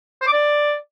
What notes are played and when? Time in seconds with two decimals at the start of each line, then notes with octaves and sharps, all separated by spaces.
0.22 C5
0.27 D6
0.33 D5